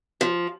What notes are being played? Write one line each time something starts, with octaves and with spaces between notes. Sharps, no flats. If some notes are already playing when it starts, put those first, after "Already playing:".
F3